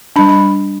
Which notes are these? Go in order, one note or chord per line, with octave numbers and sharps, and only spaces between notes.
G3 D4 B5
B5